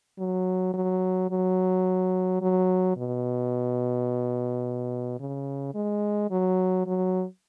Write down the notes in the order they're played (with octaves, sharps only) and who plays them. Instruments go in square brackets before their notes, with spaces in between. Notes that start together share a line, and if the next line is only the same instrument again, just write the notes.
[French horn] F#3
F#3
F#3
F#3
B2
C#3
G#3
F#3
F#3